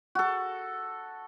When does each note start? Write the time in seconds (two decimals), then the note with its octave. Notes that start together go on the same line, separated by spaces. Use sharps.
0.15 F#4 A4